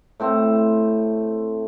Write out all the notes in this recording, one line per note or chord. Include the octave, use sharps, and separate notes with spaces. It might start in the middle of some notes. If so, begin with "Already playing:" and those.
A2 A3 C4